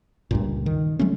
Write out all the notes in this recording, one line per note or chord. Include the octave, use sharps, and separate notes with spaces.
C#2 G2 A#2
D#3
F#3 G#3 A3 C#4